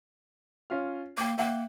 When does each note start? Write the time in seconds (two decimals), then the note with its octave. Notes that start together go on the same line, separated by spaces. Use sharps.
0.70 C#4 F4 F6
1.18 A#3 G5 D6
1.38 A#3 E5 F#5 G5